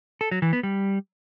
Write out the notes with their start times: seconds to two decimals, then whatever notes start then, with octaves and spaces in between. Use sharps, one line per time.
0.21 A4
0.31 F#3
0.42 E3
0.53 B3
0.63 G3